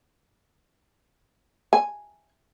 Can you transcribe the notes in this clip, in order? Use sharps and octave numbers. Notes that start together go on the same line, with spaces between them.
G#5